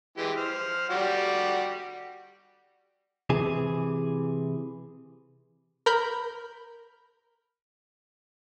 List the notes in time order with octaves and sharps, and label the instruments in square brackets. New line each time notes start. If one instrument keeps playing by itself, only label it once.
[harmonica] E3 G#3 G4
C5 F6
G3 F#4 G4
[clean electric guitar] C3 E3 G#4
[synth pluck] A#4 B5 G6